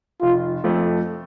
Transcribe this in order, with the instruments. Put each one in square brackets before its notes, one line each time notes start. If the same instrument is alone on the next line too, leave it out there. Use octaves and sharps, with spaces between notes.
[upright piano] F1 [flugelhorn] F4
[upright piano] F2 F3 A3 C4